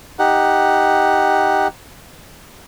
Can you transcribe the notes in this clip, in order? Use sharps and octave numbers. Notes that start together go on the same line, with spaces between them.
D#4 G4 F#5